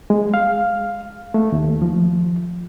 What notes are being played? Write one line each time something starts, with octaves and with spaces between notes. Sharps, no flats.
G#3
F5
A3
D#2
F3